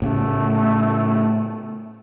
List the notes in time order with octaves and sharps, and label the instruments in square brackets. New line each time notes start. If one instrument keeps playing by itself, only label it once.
[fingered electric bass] A2 C#3 [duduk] A3